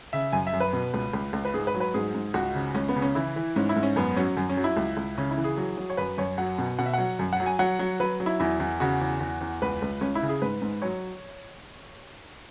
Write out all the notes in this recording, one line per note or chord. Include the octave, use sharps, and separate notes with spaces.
C#3 E5
F#2 G#5
E5
F#2
B4
B2
C#2
C#2
C#2
B4
G#2 G#4
B4
F#3
B4
G#2 G#4
G#2
C#2 F#4
C#3
C#2 C#4
B3
C#3
C#4
E3 E4
E3
G#2 C#4
E4
G#2
C#4
F#2 B3
F#3 C#4
F#2
C#4
F#3
E4
C#2
C#2
C#3 C#4
E4
E3
G#4
F#3
F#3
C#5
F#2 B4
F#2 C#5
F#3 F#5
B2
B2 F#5
E5
F#3 F#5
F#2
F#5
F#3
G#5
F#3 F#5
F#3
F#3 B4
F#3
E4
E2 E4
E2
C#3 F#4
E2
E2
E2
C#2 B4
C#2
C#2 C#4
E4
C#3
G#4
G#2 B4
G#2
F#3 C#5